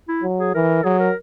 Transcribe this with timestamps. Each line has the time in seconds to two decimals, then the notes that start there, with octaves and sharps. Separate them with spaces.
0.08 E4
0.23 F#3
0.39 G#4
0.54 E3 A#4
0.84 F#3 G#4
1.00 A#4